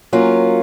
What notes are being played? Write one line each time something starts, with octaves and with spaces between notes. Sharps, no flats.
F#3 A#3 C#4 F4